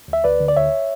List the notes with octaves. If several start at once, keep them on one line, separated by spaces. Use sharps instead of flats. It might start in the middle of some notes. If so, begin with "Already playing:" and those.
D2
E5
D2 B4 D5
D3
D5
D2 C#5 E5